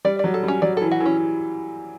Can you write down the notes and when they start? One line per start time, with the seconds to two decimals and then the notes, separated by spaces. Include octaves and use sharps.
0.05 G3 D5
0.19 F#3 D5
0.34 A4
0.43 G3
0.48 C#4
0.62 F#3 D5
0.77 E3 A4
0.91 F#4
1.00 E3
1.05 C#4